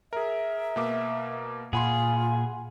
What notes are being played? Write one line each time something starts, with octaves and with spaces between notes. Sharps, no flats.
G#4 A#4 E5
B2 A#3 D6
A#2 F4 G#4 F#5 B5 C6